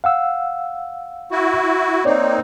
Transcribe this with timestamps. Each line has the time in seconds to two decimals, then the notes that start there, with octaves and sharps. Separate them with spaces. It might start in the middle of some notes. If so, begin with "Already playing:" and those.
0.04 F5 F#5 E6
1.32 E4 F#4
2.05 A#3 C4 D#4 C#5 D5